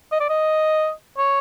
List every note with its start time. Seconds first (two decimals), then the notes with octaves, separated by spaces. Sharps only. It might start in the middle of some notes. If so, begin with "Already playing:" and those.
0.12 D#5
0.20 D5
0.29 D#5
1.18 C#5